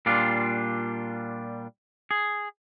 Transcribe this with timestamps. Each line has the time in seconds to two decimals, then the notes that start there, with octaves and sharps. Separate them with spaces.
0.06 A#2 G3 D4 F4
2.11 G#4